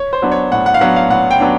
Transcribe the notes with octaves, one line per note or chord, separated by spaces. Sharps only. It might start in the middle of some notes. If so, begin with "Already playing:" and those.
Already playing: C#5
C5
F#3 B3 D4
C#5
A2 F#5
F#5
F5
F#3 B3 D4 F#5
F5
A2 F#5
G5
F#3 B3 D4